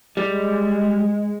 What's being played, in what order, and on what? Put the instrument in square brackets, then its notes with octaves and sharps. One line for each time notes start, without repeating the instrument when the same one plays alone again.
[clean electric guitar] G3 [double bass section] G#3